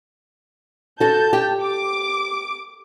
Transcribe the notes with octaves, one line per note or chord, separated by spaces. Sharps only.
F#4 A4 A5 G6
G4
D6